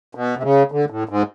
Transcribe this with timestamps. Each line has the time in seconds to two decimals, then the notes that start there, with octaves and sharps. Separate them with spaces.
0.15 B2
0.38 C3
0.43 C#3
0.72 D3
0.90 A2
1.09 G#2